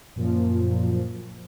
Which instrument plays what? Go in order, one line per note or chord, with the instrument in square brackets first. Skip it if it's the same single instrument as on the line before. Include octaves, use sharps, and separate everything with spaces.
[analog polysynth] F#2 A#2 F3